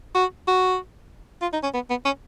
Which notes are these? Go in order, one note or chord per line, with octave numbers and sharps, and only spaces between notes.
F#4
F#4
F4
D#4
C#4
B3
B3
C#4